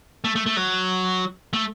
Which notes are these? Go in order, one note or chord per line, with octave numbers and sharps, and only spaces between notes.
A3
A3
A3
F#3
A3